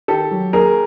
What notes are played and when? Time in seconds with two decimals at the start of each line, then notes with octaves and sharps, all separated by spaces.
0.08 D#3 G4 A4
0.31 F#3
0.53 D#2 G#4 A#4